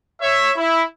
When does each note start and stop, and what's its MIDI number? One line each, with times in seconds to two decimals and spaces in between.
0.20 0.51 73
0.20 0.51 76
0.56 0.82 64